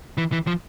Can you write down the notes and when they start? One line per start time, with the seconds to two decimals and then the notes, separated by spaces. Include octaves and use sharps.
0.18 E3
0.32 E3
0.47 F3